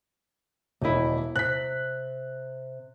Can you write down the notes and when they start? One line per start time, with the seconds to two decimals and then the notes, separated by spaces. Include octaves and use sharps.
0.81 E1 D#2 E4 D#5 E5
1.36 C3 F#6 B6